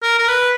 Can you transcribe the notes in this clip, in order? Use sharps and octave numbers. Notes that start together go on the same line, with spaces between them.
A#4
A#4
B4